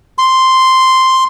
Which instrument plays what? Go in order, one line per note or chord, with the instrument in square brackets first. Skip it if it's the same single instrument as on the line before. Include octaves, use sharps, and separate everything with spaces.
[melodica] C6